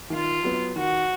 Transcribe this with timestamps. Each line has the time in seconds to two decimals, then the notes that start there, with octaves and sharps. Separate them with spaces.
0.10 D#3 F4
0.43 F#3 B3
0.75 D#3 F#4